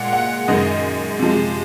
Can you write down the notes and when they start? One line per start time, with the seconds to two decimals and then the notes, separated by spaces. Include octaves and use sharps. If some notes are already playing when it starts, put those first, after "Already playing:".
Already playing: A#2 G#3 F#5
0.13 F#5
0.48 F#2 D#3 G#3 D#5
1.19 C3 F3 G#3